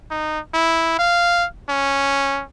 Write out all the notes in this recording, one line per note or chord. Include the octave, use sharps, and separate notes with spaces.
D#4
E4
F5
C#4